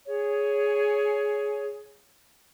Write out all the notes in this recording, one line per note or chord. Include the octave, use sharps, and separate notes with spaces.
G#4 C#5